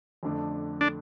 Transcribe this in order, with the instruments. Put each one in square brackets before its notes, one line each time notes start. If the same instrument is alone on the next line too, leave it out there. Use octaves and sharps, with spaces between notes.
[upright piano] F2 D3 A3 D4
[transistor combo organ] D4